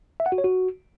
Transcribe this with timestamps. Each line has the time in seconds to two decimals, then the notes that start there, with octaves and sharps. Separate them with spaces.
0.20 E5
0.26 F#5
0.32 F#4
0.38 C#5
0.44 F#4